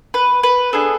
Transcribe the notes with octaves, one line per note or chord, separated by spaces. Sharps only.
B4
B4
B3 D4 G#4 A4